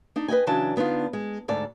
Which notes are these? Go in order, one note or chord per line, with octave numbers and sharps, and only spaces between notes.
D4 D#4
B4 D#5 G5 G#5
C#3 E3 F#3 D4 A5
D3 B3 D4 D#4 F4
G#3
D2 G#2 A4 D5